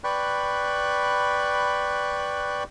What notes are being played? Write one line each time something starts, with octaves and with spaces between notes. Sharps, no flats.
B4 D5 G5 B5 C#6 F#6